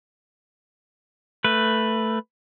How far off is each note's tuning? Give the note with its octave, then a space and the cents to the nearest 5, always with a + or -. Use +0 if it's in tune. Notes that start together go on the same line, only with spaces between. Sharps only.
A3 +10 B4 +0